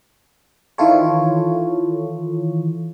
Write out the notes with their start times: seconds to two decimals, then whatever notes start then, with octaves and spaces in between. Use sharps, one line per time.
0.78 D#3 E3 E4 F4 A4 C#5